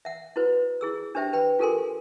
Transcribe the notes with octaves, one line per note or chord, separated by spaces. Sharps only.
E5 F#5
E4 F#4 B4 C5
E4 G#4 E6
D4 G4 C5 E5 G5
B4 G5 B5
F4 G4 A4 A#4 G#5 C6